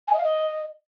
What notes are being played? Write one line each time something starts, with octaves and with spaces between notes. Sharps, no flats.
G#5
D#5
F5
D#5